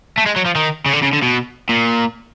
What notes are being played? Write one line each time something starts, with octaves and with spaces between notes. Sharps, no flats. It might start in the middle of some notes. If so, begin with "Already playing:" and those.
A3
G#3
F#3
F3
D#3
C#3
D3
C#3
D3
B2
A#2